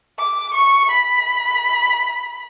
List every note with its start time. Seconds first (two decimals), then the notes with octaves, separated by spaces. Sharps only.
0.19 D6
0.54 C#6
0.91 B5